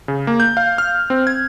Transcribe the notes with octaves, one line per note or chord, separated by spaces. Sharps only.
C#3
A#3
G6
F5
F6
C4
G#6